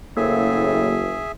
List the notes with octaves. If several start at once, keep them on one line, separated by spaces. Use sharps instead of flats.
F#1 A2 A#3 G#4 E5